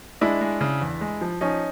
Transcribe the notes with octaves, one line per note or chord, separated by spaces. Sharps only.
G#3 D4 E4
G#3
C#3
E2
G#3
F3
F3 C#4 D#4